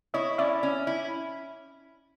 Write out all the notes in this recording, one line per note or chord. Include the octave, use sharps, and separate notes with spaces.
E4 C#5 D#5
C#4 D5 E5
C#4
E4